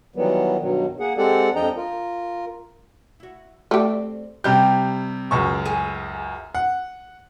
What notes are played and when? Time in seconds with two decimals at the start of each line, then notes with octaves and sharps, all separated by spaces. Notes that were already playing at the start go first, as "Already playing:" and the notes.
0.16 D#3 E3 F#3 G3 B3
0.60 G2 B2 D#3 F#3
1.00 A#3 G#4 F#5
1.17 G#3 C4 G4 A4 D5 F#5
1.55 F2 F3 D4 D#5 G5 A#5
1.77 F4 A#4
3.20 E4 F#4
3.71 A3 C4 G4 D5
4.44 C3 G3 G4 G6
5.31 C#2 F#2 C#6
5.66 G#4
6.55 F#5